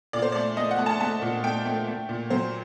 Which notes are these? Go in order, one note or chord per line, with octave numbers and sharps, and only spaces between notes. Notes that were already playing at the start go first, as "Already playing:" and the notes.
A#2 D5
C5
A3 D5
A3 D#5
F#5
A3
A5
A3 A5
A#2
A3 G5
A3
A3
A#2
F#3 C5